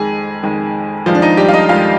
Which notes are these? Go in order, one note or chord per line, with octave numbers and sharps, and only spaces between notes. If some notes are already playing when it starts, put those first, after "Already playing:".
Already playing: F2 D#3 G#3 G#4
F2 D#3 G#3
F2 D#3 F3 G#3 F4
D4
D#4
G3 G4
F5
D#4 D#5
F2 D#3 G#3 F4 F5